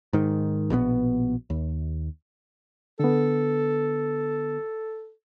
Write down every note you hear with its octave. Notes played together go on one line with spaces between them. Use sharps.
G#2 D#3
A#1 B2 D#3 B3
D#2
D3 B3 A4